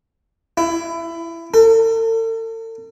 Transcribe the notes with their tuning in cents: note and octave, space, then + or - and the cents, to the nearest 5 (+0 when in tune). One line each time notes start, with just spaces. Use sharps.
E4 +20
A4 +45